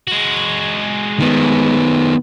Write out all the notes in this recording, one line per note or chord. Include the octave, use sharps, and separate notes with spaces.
G#3 F#4
D#3 B3